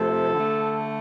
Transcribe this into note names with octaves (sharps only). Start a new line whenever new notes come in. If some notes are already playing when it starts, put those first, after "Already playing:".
Already playing: C3 F3 A3 A4
D3 A3